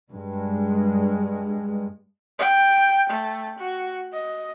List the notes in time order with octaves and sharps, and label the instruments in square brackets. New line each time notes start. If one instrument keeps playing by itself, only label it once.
[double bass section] G2 G#3
[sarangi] G5
A3
F#4
D#5